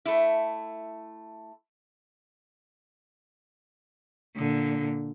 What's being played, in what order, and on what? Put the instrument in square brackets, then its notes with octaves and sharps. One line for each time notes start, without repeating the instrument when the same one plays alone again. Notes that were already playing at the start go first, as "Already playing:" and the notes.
[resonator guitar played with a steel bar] A3 E4
[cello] A#2 D3